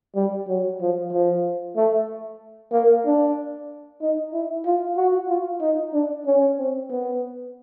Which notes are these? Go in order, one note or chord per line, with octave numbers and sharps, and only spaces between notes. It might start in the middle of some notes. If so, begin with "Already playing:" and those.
G3
F#3
F3
F3
A3
A#3
D4
D#4
E4
F4
F#4
F4
D#4
D4
C#4
C4
B3